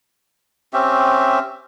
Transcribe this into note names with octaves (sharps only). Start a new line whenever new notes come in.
C4 C#4 G4 E5